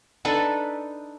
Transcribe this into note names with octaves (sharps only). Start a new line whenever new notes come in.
D4 D#4 A4 B4